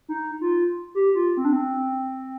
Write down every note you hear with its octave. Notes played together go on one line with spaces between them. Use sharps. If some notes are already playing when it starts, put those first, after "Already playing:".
D#4
F4
G4
F4
C4
D4
C4